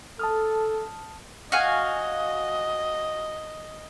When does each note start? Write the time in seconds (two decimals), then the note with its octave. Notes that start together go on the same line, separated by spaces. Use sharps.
0.19 A4 A5 D#6 F6
1.52 F#4 D#5 F5 G#5